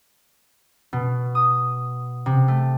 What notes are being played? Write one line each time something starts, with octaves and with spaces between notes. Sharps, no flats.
B2
D#6
C3
A3